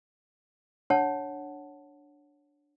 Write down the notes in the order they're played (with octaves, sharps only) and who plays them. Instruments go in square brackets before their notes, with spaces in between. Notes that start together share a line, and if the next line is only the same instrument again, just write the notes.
[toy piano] D4 C#5 F#5 A5